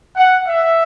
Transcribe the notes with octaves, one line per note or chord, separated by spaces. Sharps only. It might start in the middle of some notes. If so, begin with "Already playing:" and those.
F#5
E5